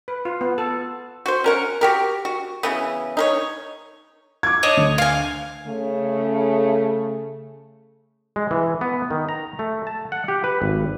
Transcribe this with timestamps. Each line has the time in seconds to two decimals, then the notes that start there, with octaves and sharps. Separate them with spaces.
0.08 B4
0.25 F4
0.41 B3
0.58 A4
1.26 F#4 C5
1.44 C#4 A#4 F#5
1.81 F#4 G4 A#4
2.25 F#4
2.63 C#3 E3 B3
3.17 D#4 A#4 C#5
4.43 D6 G#6
4.63 D4 C#5 D#5
4.77 D2
4.98 F5 G#5
5.67 C#3 A3
8.36 G#3
8.51 E3
8.81 B3
9.11 D#3
9.29 A#5
9.59 A3
9.87 A5
10.12 F#5
10.28 G4
10.44 B4
10.62 G#1